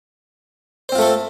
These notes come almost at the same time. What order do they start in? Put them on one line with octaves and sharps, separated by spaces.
C5 C4 F4 A3 A4